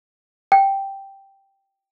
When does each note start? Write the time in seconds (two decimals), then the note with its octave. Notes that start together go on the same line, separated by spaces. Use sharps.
0.52 G5